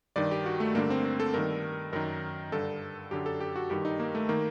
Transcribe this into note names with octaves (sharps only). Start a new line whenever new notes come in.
G2 D#3 D5
G4
F#4
A3
G2 D3 A#3
C4
C4
A4
G2 D#3 A#4
F#2 D#3 A#4
G2 D3 A4
F#2 D3 G4
A4
G4
F#4
G2 D#3 G4
D#4
A#3
A3
D#3 A#3